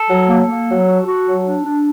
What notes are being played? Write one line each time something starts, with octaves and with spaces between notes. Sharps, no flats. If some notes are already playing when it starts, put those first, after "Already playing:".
Already playing: A4
F#3
A#3
A#3
F#3
F#4
F#4
F#3
D4
D4